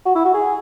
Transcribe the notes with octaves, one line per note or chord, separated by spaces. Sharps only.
F#4
E4
F#4
G#4